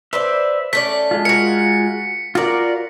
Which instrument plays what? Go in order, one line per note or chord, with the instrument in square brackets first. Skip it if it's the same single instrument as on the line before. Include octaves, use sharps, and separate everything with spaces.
[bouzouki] B4 C5 D5 [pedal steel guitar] E5
[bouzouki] A3 C#4 D5 [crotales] B6
[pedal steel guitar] G#3 F4
[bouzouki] F#4 A#4 [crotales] C#7
[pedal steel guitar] F4 A#4 [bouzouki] F#4 D5